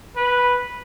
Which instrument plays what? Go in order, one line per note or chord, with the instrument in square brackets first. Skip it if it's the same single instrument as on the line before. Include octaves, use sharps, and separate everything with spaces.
[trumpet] B4